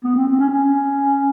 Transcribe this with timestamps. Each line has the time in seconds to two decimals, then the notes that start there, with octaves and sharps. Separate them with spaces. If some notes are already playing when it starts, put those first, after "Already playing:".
0.04 B3
0.16 C4
0.27 C4
0.39 C#4
0.50 C#4